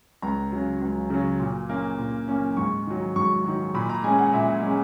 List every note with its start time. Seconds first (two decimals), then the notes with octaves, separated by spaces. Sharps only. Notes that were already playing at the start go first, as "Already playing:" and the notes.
0.22 C#2 A#5
0.52 C#3 F#3
0.81 C#2
1.10 C#3 F#3
1.40 A#2
1.69 A#3 C#4
1.98 A#2
2.28 A#3 C#4
2.57 G#2 C#6
2.87 D#3 F#3
3.16 G#2 C#6
3.45 D#3 F#3
3.74 A#2 B5
3.89 A#5
4.04 G#3 C#4 G#5
4.19 F#5
4.33 A#2 E5
4.62 G#3 C#4